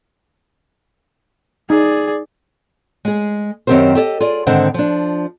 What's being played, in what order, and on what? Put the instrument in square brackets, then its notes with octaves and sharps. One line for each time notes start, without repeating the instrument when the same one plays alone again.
[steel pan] D#4 [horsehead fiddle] G#4 D5
[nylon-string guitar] G#3 G#4
F#2 D#3 C4 G4 A#4 C5
G4 A4 D5 D#5
F4 G#4 D5
G#2 D3 D#3 C4 C5 F#5
F3 D4